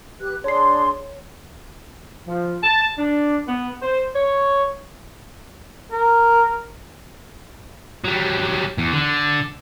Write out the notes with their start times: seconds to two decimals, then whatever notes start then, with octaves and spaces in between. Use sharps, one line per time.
0.20 G4 B4 F#6
0.44 D4 G#4 C#5 C6 C7
2.27 F3
2.62 A5
2.98 D4
3.46 B3
3.80 C5
4.14 C#5
5.92 A#4
8.05 F#3 G3
8.78 E2
8.92 D3